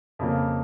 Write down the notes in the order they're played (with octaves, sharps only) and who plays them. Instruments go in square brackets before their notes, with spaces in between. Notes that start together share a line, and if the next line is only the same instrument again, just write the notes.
[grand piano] F2 C#3 A#3